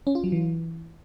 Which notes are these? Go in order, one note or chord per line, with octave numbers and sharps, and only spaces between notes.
C#4
F4
F#3
E3